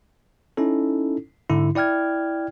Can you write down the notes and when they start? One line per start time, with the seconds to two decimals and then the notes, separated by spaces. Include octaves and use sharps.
0.57 C#4 D#4 E4 A4
1.49 G#2 D3 E4
1.75 E4 D5 G5 F6 G#6